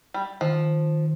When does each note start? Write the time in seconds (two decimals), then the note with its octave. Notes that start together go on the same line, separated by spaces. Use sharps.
0.14 G3
0.41 D#3 F3